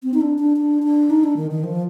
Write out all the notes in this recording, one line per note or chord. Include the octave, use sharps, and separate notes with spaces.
C4
D#4
D4
D4
D4
D4
D#4
D4
D#3
D#3
F3